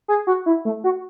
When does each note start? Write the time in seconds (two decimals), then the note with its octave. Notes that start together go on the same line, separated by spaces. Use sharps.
0.08 G#4
0.27 F#4
0.46 E4
0.65 A3
0.84 F#4